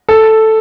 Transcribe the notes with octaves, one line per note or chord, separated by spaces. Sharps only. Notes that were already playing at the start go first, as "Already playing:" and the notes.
A4